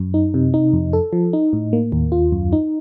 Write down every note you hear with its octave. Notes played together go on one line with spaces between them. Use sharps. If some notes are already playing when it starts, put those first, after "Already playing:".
Already playing: F#2
D#4
C3
D#4
F2
A4
F3
D#4
A2
A#3
D#2
F4
F#2
D#4